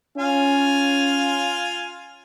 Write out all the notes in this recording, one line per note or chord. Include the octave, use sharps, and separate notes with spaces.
C#4 F4 F5 G#5